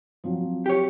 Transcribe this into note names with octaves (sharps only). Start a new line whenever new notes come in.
F3 F#3 C4
G4 C#5